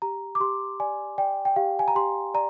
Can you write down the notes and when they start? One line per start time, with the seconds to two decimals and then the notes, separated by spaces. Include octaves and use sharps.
0.02 G4 A#5
0.35 D6
0.40 G4 C6
0.80 D5 G#5
1.18 D5 G5
1.45 G5
1.56 G4 F5
1.79 G#5
1.88 A#5
1.95 G4 C6
2.34 D5 A#5